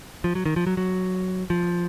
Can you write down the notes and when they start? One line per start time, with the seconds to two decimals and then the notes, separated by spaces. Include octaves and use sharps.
0.24 F3
0.35 F#3
0.46 D#3
0.56 F3
0.66 F#3
0.77 F#3
1.50 F3